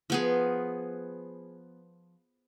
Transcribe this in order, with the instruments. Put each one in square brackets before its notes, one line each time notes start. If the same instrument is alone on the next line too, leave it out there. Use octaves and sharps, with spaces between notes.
[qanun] F3 B3 G#4